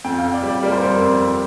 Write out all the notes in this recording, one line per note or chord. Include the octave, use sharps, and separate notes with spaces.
F2 G5
F5
F2
D5
G3
D5
G3 A#4
C5
F2 A#4
F2
F2